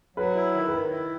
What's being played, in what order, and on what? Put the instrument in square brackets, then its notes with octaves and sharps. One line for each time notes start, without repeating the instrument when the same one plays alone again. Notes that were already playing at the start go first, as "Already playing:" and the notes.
[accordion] F#3 [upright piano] B4
[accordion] E4
D#3
[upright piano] B4
[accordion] D#3 [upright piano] A#4
[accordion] E4